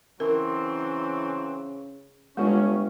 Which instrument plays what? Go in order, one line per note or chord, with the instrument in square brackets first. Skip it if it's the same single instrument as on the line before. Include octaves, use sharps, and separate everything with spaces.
[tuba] C#3 [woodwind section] E3 F#3 C4 [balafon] A#4
[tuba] G1 [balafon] G#3 F4 [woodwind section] C#4